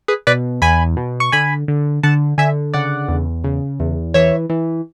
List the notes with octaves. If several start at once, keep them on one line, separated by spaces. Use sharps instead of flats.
G#4 B4
B2 B4 D5
E2 G#5 B5
B2
C#6
D3 G#5 B5
D3
D3 F#5 A5
D3 E5 G#5
C#3 D5 F#5
E2
C#3
E2
E3 C#5 E5
E3